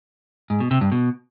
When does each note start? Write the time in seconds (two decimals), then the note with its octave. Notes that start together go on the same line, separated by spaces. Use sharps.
0.50 G#2
0.60 B2
0.71 C3
0.81 G2
0.92 B2